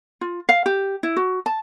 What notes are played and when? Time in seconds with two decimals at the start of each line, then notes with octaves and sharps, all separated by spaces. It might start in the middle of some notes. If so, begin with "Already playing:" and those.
0.21 F4
0.49 F5
0.66 G4
1.03 E4
1.17 F#4
1.46 A5